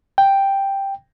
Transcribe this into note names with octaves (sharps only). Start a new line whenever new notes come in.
G5